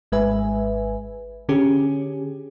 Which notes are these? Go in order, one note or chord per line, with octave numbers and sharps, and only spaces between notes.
G#1 G#3 B4 E5 G#5
D3 C#4 G4 G#4